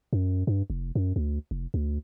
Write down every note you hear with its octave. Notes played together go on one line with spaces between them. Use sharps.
F#2
G2
F1
F#2
D2
F1
D2